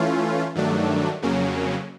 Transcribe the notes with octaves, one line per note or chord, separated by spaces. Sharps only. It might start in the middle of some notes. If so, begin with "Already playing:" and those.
Already playing: E3 A3 C#4 F4
G2 D#3 F#3 A3 D4
F2 C#3 F#3 A#3 C#4